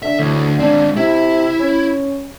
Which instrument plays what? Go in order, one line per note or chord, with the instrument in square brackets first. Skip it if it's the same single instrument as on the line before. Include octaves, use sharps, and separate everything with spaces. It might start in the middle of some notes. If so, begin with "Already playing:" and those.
[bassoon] D3 [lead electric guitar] E5
[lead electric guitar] D2 [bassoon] A2
[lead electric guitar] G#3 C4 [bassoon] D4
[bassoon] C3 [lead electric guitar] E4
[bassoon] C#4